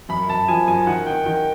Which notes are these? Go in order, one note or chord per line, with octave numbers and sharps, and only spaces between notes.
F#2 B5
F#2 A5
F3 G#5
F#2 G#5
D#3 F#5
D#3 G5
D#3 G5